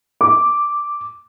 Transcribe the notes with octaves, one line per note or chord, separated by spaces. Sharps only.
D6